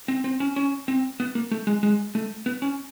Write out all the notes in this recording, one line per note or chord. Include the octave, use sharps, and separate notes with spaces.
C4
C4
C#4
C#4
C4
B3
A#3
A3
G#3
G#3
A3
B3
C#4